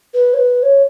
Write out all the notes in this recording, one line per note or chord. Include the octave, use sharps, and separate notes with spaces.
B4
C#5
B4
C#5